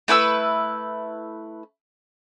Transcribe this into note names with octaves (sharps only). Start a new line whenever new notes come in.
A3 E4 B4 E6